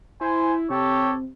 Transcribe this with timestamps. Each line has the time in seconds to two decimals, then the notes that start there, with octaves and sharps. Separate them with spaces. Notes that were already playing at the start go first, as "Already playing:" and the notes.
0.21 E4 C5 G#5
0.70 C3 G4 A4 C#5